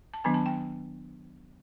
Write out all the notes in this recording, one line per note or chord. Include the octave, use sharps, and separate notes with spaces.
A5
D#3 F#3 B3 D4 G#5
A5
G5